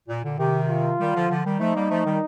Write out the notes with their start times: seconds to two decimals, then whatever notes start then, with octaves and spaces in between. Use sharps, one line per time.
0.09 A#2
0.24 A#2 D3
0.39 C3 D#3 G4
0.69 F4
0.99 D#3 G3
1.14 D3 F3
1.30 D3 F3
1.45 D#3 G3
1.60 F3 A3 D#4
1.75 G3 A#3
1.90 F3 A3
2.05 D#3 G3